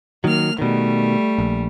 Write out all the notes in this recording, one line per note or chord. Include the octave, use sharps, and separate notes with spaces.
D#3 F#3 A#3 F6
B2 D#3 G3 A3
A#1